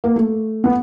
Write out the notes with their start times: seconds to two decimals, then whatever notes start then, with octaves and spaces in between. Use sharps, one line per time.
0.04 A#3
0.16 A3
0.64 B3